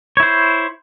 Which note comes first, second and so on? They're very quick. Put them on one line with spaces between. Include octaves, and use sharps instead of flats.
C#5 E4 C5